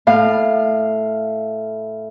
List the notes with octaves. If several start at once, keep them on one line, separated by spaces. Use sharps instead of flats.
A2 F5